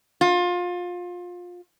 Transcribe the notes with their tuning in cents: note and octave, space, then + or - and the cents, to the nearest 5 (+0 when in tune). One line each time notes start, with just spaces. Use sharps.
F4 +25